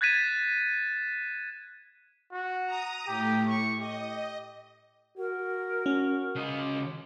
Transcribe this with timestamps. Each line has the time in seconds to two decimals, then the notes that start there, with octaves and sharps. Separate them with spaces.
0.01 F#6 G#6 A6 B6 D#7 E7
2.32 F#4
2.66 A#5 D#6
3.07 A2 G4
3.48 C#6
3.79 G4 D#5
5.18 F#4 A#4
5.86 C#4
6.36 C#3 D#5